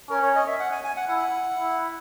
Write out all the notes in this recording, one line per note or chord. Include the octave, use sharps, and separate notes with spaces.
C#4 A#4
C#5
D#5
E5
F#5
G#5
G#5
F#5
E4 F#5
E4